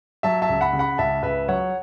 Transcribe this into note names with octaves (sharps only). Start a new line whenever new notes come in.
F#3 E5 A5
E5 A5
C#2
F#5 B5
C#3
F#5 B5
C#2 E5 A5
C#2 B4 E5
F#3 C#5 F#5